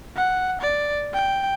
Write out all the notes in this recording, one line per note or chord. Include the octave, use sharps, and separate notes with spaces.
F#5
D5
G5